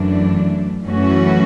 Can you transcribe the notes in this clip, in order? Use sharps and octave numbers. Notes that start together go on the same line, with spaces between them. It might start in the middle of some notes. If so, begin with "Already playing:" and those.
Already playing: F#2 E3 A3 D4
F#2 E3 A3 C#4 F#4